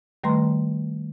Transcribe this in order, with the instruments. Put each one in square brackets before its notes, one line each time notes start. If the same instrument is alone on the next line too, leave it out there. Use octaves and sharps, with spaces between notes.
[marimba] D#3 G3 A3 B4 A#5 C6